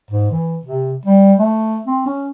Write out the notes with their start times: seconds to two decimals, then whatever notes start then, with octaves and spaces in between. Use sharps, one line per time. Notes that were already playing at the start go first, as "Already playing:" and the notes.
0.11 G#2
0.31 E3
0.65 C3
1.06 G3
1.39 A3
1.87 C4
2.06 C#4